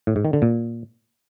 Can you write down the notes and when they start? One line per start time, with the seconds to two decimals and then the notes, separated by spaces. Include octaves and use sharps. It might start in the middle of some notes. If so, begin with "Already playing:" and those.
0.07 A2
0.16 G#2
0.25 D#3
0.33 D3
0.42 A#2